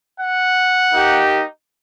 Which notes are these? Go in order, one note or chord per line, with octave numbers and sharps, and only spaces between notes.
F#5
A#3 D#4 G4